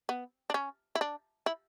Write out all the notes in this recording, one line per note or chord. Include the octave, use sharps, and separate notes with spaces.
B3
D4
C#4
E4
D4
E4